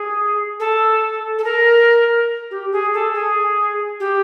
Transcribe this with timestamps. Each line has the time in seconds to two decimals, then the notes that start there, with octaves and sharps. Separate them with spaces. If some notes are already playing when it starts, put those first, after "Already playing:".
Already playing: G#4
0.59 A4
1.38 A4
1.44 A#4
2.50 G4
2.72 G#4
2.93 A4
3.14 G#4
3.99 G4